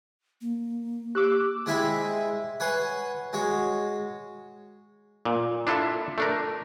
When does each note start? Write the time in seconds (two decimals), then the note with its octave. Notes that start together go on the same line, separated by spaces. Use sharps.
0.41 A#3
1.15 G4 D6 E6 F#6
1.66 G#3 C4 E4 E5 G#5 B5
2.60 B4 C#5 F#5 G#5 C6
3.33 G#3 F#4 C#5
5.25 A#2
5.67 D4 E4 F4 A4 E5
6.18 A3 D4 A#4